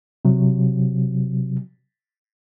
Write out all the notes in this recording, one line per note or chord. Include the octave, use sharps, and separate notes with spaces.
C3 F#3